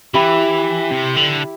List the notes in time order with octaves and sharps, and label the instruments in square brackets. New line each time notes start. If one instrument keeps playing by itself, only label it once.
[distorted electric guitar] E3 [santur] E4 G4
[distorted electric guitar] C3
D3